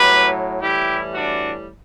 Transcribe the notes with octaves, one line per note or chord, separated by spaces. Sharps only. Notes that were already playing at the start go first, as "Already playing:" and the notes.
Already playing: A2 F#3 G4 B4
A2 E3 G3 E4 G4
D4 F#4